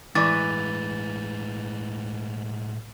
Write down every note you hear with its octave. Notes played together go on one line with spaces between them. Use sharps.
A2 E3 G#3 D5 C#6 D6 A6